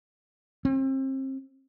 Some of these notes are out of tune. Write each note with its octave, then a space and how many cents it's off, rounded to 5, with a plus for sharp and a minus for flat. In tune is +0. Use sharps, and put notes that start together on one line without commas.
C4 +35